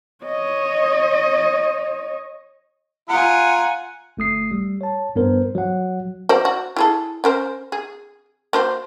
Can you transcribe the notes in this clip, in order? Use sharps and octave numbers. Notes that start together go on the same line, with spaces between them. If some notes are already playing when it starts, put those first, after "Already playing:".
C#5 D#5
F4 F#5 G#5 A#5
G1 A3 D#6 C7
G3
C#5 A5
G2 B3 A#4 C5
F#3 F#5
F#4 C5 D5
F#4
E4 G#4 A4
C#4 A#4 C5
G#4
A#3 F#4 C5